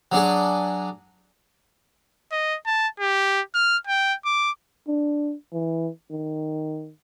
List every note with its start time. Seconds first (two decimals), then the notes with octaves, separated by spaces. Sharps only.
0.12 F#3 D4 G#4
2.32 D#5
2.66 A5
3.00 G4
3.55 F6
3.87 G5
4.25 D6
4.88 D4
5.53 E3
6.11 D#3